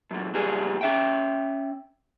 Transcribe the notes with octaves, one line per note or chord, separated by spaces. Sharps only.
F#2 A#2
C#2 A#2 G3 G#4
C#4 E5 G5